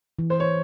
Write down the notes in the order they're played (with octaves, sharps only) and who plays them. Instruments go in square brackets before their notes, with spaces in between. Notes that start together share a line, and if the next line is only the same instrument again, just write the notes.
[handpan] E3
[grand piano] C5
C#5